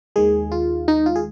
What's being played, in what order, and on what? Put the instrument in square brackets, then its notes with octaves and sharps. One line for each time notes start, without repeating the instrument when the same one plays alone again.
[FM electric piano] D#2 D#3 G#3 G#4
F4
D#4
F4
G#4